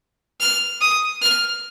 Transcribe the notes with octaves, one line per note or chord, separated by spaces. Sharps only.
F6
D#6
F6